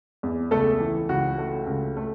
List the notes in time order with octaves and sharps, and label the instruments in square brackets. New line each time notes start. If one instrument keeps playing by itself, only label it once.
[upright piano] E2
C#2 A3 A4
E3
C#2 F#4
A3
C#2
A3